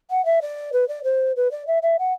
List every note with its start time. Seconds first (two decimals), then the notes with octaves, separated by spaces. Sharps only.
0.10 F#5
0.25 E5
0.41 D5
0.73 B4
0.88 D5
1.04 C5
1.36 B4
1.51 D5
1.67 E5
1.82 E5
1.99 F#5